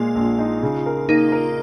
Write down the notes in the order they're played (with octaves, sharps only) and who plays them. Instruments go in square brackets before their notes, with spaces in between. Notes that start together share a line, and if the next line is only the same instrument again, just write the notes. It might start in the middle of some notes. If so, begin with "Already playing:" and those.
Already playing: [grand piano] A#2 G#3 [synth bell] F4
[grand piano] A#1
D#4
C#3
A#4
[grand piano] A#3 [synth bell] D#4
[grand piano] A#4